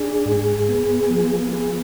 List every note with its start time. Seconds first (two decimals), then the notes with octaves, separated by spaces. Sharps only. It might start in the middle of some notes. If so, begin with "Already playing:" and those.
Already playing: D4 G#4
0.26 G#2
0.69 B3
1.10 F3
1.53 B3 G#4